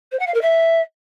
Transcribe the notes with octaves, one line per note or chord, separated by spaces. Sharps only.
C5
F#5
F5
A#4
E5